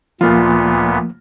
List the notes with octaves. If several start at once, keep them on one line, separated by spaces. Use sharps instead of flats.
D2 A#2 F3 A#3 B3 F4